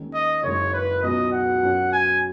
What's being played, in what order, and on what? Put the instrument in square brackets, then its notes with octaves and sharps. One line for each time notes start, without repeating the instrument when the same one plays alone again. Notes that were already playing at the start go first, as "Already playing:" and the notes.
Already playing: [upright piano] D#2 D#3 G#3 C#4
[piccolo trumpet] D#5
[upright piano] F#1 F#2 D#3 G#3 [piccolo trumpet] C#5
[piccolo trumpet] B4
[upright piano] C#2 B2 F#3 D#4 [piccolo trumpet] D#5
[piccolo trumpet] F#5
[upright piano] F#2 F#3 C#4
[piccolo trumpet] G#5